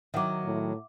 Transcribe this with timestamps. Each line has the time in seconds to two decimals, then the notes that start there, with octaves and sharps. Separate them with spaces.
0.14 D#3 F#3 E5 F#5 D6
0.45 A2